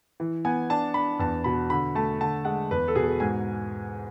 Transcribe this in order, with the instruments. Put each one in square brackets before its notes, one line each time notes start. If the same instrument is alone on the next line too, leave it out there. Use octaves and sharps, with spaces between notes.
[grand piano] E3
B3 G#5
D4 A5
D4 B5
E2 A5
B2 B5
D3 B5
A3 A5
D3 A5
G#3 F#5
E2 B4
A4
B2 G#4
A4
G#2 G#5